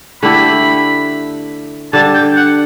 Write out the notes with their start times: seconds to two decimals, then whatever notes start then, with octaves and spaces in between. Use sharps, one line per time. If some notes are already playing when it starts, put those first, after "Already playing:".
0.23 D3 A3 E4 G4 B5
1.93 D3 G3 D4 A5
2.14 G5
2.36 F#5